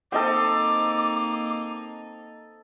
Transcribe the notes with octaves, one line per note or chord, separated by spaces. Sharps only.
A#3 C4 D#4 A4 D#5 G5 D6